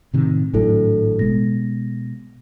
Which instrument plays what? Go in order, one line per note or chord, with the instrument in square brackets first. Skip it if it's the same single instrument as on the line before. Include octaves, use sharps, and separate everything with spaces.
[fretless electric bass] A2 C3 D#3
[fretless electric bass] G#1 A2 F#3 [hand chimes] D4 E4 A4
[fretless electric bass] B2 G#3 [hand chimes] A#6